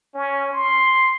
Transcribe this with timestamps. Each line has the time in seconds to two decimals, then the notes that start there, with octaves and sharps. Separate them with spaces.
0.14 C#4
0.52 C6